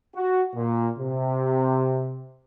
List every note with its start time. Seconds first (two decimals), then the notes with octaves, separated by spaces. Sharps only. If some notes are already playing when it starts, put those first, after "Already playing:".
0.15 F#4
0.55 A#2
0.99 C3